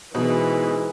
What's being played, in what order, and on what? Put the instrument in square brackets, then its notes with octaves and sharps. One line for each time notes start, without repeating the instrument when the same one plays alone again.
[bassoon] G#2 [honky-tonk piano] B2 [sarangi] E3